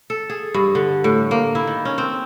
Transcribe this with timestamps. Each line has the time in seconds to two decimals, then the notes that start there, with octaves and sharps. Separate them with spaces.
0.10 A4
0.30 G#4
0.54 G2
0.75 D3
1.04 A2
1.31 A#3
1.55 E4
1.67 D#3
1.85 C#4
1.98 C4